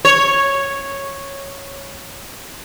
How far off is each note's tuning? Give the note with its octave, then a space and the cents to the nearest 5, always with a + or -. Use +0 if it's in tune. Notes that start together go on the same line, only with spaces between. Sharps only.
C#5 -5